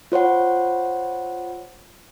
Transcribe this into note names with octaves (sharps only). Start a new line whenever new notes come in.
F4 C5 C#5 F#5